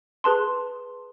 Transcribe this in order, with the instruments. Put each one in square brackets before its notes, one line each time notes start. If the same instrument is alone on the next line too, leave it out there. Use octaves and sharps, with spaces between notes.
[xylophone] G#4 B4 A5 C6